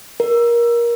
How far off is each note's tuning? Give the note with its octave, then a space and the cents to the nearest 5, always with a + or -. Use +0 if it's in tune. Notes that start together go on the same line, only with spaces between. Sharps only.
A#4 +20